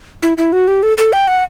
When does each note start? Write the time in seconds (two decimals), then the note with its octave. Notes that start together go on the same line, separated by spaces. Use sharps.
0.23 E4
0.37 E4
0.53 F#4
0.68 G4
0.83 A4
0.98 A4
1.13 G5
1.28 F#5